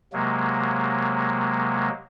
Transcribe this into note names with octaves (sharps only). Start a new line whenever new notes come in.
C3 F#3 G#3 A#3